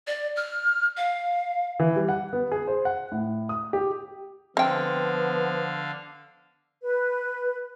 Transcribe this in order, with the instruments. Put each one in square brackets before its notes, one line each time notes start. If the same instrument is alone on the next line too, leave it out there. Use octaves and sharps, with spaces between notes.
[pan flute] D5
F6
F5
[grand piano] E3
G3
F#5
B3
G#4
C5
F#5
A2
D#6
G4
[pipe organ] D3 F5 [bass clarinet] F3 [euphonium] B3 [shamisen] C4 G5
[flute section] B4